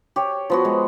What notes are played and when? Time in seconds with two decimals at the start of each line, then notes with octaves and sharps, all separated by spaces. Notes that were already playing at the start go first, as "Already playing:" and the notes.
0.16 G4 C#5
0.50 F3 B3 F#4
0.65 G#3